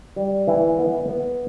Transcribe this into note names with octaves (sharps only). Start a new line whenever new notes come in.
G3
E3
B3
B3